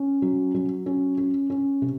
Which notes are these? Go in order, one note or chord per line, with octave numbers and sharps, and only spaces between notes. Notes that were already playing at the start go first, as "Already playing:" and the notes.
Already playing: C#4
F#3
F#3
C#4
C#4
C#4
C3